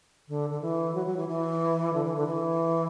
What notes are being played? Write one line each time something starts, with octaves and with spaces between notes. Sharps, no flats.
D3
D3
E3
F#3
F#3
E3
E3
D3
E3
D3
E3